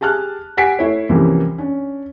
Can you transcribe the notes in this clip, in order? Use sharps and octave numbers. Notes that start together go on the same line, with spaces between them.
G4 G#4 A5 F6 F#6
G4 F#5 G#5 B6 C7 D7
A3 E4 C#5
C2 C#3 E3 F3 G3 A#3
C#4 D4